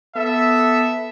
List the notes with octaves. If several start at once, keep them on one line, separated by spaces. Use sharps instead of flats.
B3 A4 E5